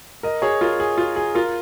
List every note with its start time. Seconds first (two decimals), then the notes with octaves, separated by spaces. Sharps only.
0.23 A#4 D#5
0.42 G#4 C#5
0.61 F4 A#4
0.80 G#4
0.98 F4
1.16 G#4
1.35 F4 A#4